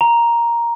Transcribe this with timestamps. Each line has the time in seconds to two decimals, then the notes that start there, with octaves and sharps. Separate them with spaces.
0.01 A#5